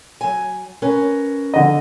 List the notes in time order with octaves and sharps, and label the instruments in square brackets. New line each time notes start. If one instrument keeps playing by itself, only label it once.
[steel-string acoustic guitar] F#3 G#5
C#4 A#4 B4
[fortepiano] D3 D#5